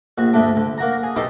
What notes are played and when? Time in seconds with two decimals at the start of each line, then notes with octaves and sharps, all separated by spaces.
0.18 A#1 F#4
0.33 D2 G2 A3 D4
0.57 D3
0.78 A#3 F#4 A#5
1.03 G#4
1.16 B2 D#4 G4 A4 C6